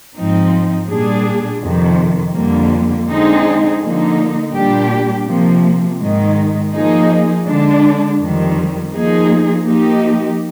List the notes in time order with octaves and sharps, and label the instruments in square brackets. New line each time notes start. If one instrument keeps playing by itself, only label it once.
[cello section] G#2 F3 C4 D#4
A#2 G3 D4 G#4
F2 C3 D#3
F2 D3 G3 A#3
D3 G#3 C4 D#4 G#4
D3 F3 A#3 D#4
A#2 G3 D4 G4
C3 F3 A#3
G#2 D#3 G#3 D#4
F3 A#3 D#4 G#4
D3 G#3 D4
F2 D#3 G3
F3 A#3 D#4 G#4
F3 A#3 D#4 G4